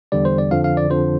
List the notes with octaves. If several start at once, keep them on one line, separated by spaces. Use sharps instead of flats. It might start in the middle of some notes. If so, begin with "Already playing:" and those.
E2 D3 G3 D5
C5
D5
F2 D3 F3 F5
F5
D5
F2 D3 F3 C5